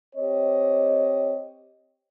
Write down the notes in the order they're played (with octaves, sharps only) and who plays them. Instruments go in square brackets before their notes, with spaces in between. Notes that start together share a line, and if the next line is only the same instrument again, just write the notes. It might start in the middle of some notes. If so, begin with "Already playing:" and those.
[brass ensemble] C4 G4 C#5 D#5